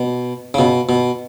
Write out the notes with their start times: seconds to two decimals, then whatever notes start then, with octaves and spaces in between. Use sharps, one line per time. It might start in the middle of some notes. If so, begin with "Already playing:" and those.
Already playing: B2
0.54 C#3
0.59 B2
0.89 B2